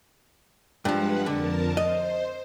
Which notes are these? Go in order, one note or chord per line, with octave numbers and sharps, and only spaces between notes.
G2 F3 G#3 B4 F#5
F2 D3 A#4 A5
C5 D#5